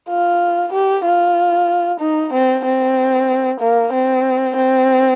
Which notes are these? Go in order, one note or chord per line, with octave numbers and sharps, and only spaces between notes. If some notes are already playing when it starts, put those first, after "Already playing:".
F4
G4
F4
D#4
C4
C4
A#3
C4
C4